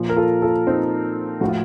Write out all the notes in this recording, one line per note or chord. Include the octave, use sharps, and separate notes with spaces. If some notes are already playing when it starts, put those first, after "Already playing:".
Already playing: A#2 F3
A#4
F4 A4
F4 A4
C4 D#4
A2 F3 F4 F#4